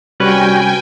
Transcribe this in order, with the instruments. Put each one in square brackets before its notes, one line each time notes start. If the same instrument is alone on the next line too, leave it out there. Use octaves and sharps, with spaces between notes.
[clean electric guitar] C2 C#4 B4 [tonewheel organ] G3 F#4 [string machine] G5 G#5